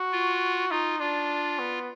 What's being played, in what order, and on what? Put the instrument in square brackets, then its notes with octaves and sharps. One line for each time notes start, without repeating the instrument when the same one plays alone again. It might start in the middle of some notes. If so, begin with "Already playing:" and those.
Already playing: [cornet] F#4
[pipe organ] F4
[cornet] D#4 [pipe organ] F4
[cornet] D4 [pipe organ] F4
[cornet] B3